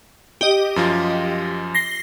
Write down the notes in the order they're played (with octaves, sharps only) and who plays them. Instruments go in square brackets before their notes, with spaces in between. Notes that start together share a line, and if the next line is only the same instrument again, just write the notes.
[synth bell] G4 D#5
[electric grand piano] F#2 F3 F4
[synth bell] A#6 C7 G7